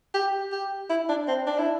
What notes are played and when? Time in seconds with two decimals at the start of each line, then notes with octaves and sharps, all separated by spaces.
0.14 G4
0.52 G4
0.90 E4
1.09 D4
1.28 C4
1.47 D4
1.58 E4